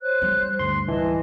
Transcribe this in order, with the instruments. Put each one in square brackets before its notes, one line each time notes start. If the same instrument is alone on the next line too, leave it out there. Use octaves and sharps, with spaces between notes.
[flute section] C5 C#5 F#6
[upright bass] G3
[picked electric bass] D2 G2 [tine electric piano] C6
[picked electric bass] D1 G#1 [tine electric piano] E3 [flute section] D#5 A5